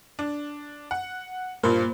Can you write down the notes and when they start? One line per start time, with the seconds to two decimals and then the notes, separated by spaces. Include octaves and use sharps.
0.19 D4
0.91 F#5
1.63 G2 A#2 A#3 F4 C5